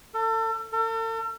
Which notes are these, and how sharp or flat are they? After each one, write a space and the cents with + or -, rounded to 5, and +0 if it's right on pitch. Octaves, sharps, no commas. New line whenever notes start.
A4 +35
A4 +45